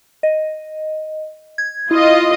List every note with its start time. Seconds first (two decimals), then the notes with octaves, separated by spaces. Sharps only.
0.23 D#5
1.58 G#6
1.91 E4 F4 D#5